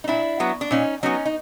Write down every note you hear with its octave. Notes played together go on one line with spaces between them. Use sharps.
D#4
A#2 D4 E4
F#3 B3
D4
A#2 C#4 D#4
F#3 B3 C#4 D#4
D#4